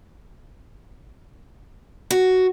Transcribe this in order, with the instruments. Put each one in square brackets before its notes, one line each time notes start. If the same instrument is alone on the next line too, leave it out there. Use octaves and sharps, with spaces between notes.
[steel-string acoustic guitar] F#4